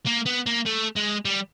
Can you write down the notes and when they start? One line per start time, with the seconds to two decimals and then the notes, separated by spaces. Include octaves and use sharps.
0.06 A#3
0.26 B3
0.46 A#3
0.66 A3
0.96 G#3
1.25 G3